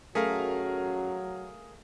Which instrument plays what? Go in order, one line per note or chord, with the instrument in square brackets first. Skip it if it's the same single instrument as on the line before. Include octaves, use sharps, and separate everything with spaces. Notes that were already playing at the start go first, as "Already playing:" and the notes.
[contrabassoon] F#2 [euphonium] F#3 [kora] A3 [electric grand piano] G#4 A#4 F5